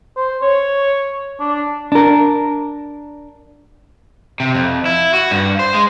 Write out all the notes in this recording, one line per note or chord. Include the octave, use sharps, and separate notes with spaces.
C5
C#5
D4
D4 A#4
C3
F2
E4
F#4
G2
C5
G#3